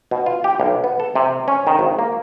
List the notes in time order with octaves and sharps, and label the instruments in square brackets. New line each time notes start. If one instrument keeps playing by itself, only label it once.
[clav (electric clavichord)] B2
F4
G4
B1
B3
A4
C3
C#4
D#3
G#1
A#3